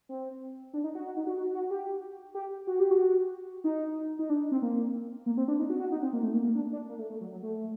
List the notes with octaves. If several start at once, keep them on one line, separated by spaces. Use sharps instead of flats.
C4
D4
D#4
F#4
F#4
D#4
F#4
F#4
F#4
G4
G4
F#4
G4
F#4
D#4
D#4
D4
C4
A#3
A#3
C4
D4
D#4
F#4
F#4
D#4
C4
A#3
A3
A#3
A#3
D4
D4
A#3
A3
A3
F#3
F#3
A3